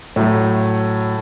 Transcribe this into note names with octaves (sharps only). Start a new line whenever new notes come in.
A2 F#3 A3